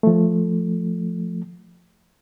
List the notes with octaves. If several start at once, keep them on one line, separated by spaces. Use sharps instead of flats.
F3 A3